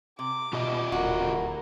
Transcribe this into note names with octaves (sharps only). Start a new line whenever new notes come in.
C3 D6
B2 F4 G4 D#5
D1 E4 F#4 A#4